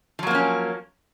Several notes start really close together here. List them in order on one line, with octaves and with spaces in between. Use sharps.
F3 F#3 A#3 C4 C#4